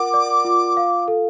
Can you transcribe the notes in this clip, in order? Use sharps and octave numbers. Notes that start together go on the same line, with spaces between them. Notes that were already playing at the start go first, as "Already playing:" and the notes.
Already playing: F4 A#4 F#5 D6
D5
F4
F5
A4